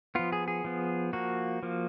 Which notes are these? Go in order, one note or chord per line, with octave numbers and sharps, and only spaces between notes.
F3 B3 F4
G#4
G#4
F3 B3
F3 A#3 F#4
F3 A#3